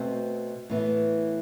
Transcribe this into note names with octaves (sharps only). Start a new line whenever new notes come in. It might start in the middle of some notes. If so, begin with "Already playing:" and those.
Already playing: B2 A3 C4
A2 E3 B3